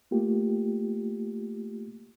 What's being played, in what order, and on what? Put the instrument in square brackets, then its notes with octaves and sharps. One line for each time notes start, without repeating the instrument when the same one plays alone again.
[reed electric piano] A3 A#3 F4 G4